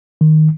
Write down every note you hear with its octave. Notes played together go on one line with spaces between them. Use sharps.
D#3